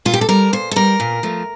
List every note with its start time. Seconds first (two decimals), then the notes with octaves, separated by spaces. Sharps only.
0.05 A#2 F4
0.14 G4
0.21 A4
0.29 G3 A#4
0.53 A#2 C5
0.71 A4
0.76 G3 A#4
1.00 A#2
1.23 F3 A3